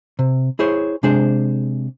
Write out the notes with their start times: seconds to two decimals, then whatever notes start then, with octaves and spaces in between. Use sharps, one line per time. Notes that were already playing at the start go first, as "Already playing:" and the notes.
0.19 C3
0.59 E4 G#4 C5 C#5
1.03 C3 G#3 D4 G#4 C5